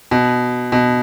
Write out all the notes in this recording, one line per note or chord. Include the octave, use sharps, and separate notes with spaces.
B2
B2